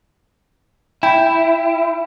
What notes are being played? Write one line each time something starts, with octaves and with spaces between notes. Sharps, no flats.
E4 G5